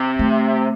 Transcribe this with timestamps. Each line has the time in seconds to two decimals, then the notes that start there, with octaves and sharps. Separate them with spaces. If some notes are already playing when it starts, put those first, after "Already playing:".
Already playing: C3
0.19 A3